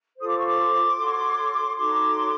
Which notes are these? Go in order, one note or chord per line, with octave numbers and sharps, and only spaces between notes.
F4 A4 C5 D#6
D6
C#6
C6 D6
F#4 A4 C#5
D#4 F#4 A4 C#5 C6 D6